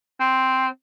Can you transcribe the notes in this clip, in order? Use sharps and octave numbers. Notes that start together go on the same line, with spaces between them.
C4